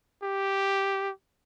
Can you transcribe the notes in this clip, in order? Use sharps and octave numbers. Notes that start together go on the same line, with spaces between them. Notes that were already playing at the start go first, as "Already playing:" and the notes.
G4